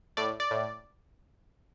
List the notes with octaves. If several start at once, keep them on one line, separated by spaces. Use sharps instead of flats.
A2 D5
D5
A2